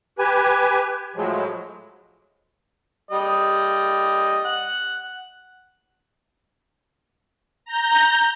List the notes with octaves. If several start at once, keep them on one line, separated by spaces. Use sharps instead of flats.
G4 B4 G#5
A2 F3 F#3 G#3
G3 D#5
F#5
A#5 G6